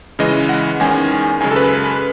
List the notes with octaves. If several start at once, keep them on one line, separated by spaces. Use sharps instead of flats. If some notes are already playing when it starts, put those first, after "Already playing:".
C#3 E3 G#3 D#5
F#5
E2 D#3 G#3 C#4 G#5
F#2 C#3 G#3 G#5
A4
B4